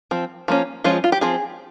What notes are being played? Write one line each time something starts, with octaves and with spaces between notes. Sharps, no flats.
F3 C4
F3 A#3 C#4
F3 G#3 C#4 F4
F4
G4
F3 C4 G#4